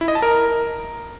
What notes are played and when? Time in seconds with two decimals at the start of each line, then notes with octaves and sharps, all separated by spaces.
0.01 E4
0.08 D#5
0.15 A5
0.22 A#4